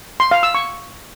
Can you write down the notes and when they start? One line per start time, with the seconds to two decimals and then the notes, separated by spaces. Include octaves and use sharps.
0.20 C6
0.31 F5
0.43 E6
0.55 C#6